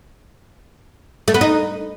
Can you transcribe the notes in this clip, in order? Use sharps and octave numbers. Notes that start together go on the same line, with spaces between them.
A3
B3
D#4